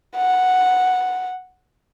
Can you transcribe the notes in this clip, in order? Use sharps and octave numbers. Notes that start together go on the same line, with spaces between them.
F#5